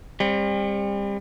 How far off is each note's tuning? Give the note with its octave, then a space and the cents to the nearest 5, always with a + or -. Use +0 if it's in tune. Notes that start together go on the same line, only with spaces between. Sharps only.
G3 +35 C4 +30